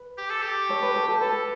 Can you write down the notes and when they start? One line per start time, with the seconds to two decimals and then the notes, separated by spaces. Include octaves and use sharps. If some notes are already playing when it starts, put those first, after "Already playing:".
Already playing: B4
0.18 G4
0.30 A4
0.42 G4
0.69 A4 C#5
0.83 B4
0.96 A4
1.08 A4
1.21 A4 B4